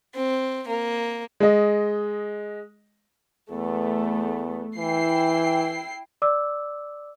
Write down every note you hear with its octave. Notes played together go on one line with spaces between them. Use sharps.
C4
A#3
G#3 D#5
E2 A3 B3
E3 E4 G5 C7
D5 D6 E6